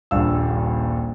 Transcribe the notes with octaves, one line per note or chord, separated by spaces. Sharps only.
D#1 A#1 G2 F5 E6